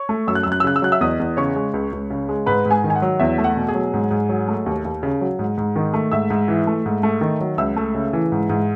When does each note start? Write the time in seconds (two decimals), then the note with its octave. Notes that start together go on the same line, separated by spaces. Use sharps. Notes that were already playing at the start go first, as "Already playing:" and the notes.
Already playing: C#5 C#6
0.09 A3
0.28 F#2 E6
0.35 F#6
0.43 F#2 E6
0.52 F#6
0.60 E6
0.64 C#3 F#6
0.76 E6
0.82 F#3 F#6
0.92 E5 E6
1.01 E2 D#5 D#6
1.20 E2
1.37 C#3 C#5 C#6
1.56 G#3
1.74 C#2
1.92 C#2
2.10 C#3
2.29 G#3
2.46 G#2 B4 B5
2.66 G#2
2.71 G#4 G#5
2.84 D#3
2.90 G#5
2.96 F#5
3.02 F#3
3.20 E2 E5
3.38 A3
3.44 F#5
3.56 B2
3.68 G#4 G#5
3.75 F#3
3.94 G#2
4.11 G#2
4.29 F#3
4.48 A3
4.66 D#2
4.84 D#2
5.03 C#3
5.21 F#3
5.39 G#2
5.58 G#2
5.76 D#3
5.94 A3
6.12 G#2 E5 E6
6.30 G#2
6.48 E3
6.67 A3
6.86 G#2
7.03 A3
7.21 D#3
7.41 F#3
7.58 C#2 E5 E6
7.76 A3
7.94 C#3
8.13 E3
8.32 G#2
8.49 G#2